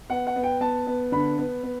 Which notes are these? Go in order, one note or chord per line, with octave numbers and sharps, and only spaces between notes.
B3 F#5
F#5
B3
G5
B3 A5
B3
D3 B5
B3
B3